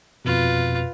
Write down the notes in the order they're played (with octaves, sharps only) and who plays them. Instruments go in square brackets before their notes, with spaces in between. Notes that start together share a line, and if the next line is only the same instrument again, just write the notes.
[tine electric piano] F2 B2 [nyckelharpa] F4 B4